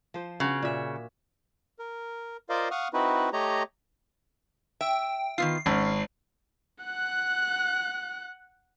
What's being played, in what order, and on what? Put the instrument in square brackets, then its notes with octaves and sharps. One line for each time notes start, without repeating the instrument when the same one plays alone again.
[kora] F3 C5
[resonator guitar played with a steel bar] C#3 [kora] B3 F#4
[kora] A#2 E5
[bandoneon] A#4
F4 A#4 C5 D5 D#5 F5
F5 F#5 C#6 D#6 F6
C4 D#4 E4 F#4 B4
A3 G4 C#5 D#5 A#5
[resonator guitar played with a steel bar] E5 [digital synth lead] G5
[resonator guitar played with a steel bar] D#3 B3 F4 [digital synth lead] C7
[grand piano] G#1 [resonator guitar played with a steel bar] C#4
[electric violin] F#5 F#6